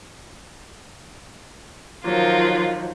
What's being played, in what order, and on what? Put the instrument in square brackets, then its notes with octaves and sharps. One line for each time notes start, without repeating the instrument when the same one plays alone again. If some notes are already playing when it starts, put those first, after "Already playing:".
[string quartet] D#3 F3 F#3 [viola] F4 A#4